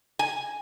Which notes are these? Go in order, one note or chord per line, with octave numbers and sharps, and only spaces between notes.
G#5